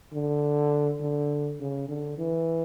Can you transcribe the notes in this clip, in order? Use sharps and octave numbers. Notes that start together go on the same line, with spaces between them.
D3
D3
C#3
D3
E3